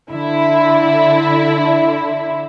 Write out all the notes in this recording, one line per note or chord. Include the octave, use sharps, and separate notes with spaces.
D3 E4